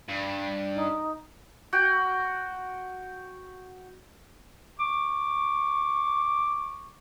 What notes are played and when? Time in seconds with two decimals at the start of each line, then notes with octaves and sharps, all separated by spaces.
0.09 G2
0.75 D#4
1.73 F#4 G5
4.79 C#6 D6